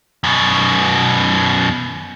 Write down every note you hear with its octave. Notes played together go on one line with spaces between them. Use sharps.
F#2 B2